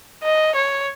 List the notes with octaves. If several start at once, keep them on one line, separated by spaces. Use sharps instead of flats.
D#5
C#5